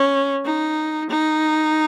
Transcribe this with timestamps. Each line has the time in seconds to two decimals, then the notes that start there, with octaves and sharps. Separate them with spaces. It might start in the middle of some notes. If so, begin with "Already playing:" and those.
Already playing: C#4
0.45 D#4
1.09 D#4